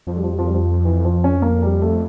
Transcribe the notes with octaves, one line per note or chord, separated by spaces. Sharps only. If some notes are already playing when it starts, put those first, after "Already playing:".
F2 F3
G3
F3
G3
F3
G3
F3
E3
F3
C#4
A#3
G3
A3